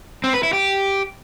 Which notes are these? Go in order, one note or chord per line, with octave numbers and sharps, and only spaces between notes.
C4
B4
E4
G4